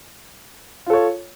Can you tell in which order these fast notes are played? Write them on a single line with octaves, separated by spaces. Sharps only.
F4 A4 C#5